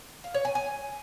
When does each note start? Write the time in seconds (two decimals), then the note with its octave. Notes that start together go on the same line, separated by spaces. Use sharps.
0.24 F5
0.34 C#5
0.45 G#5
0.55 G#5